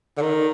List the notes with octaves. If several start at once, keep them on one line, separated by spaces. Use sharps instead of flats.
D3
D#3